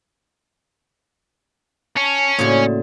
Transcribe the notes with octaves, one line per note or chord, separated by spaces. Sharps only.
C#4 A5
A2 C#3 A#3 F#4 D5